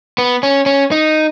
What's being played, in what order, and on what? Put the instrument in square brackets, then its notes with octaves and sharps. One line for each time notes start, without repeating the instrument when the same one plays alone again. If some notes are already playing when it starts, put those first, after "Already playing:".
[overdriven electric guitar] B3
C#4
C#4
D#4